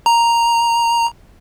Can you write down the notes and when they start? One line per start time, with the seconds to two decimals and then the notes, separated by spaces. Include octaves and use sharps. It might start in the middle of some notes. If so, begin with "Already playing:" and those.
0.06 A#5